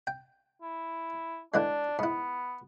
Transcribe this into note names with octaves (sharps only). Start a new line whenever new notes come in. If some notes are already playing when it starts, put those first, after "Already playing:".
G5
E4
D3 E3 G#3 D4
G#2 B3 E4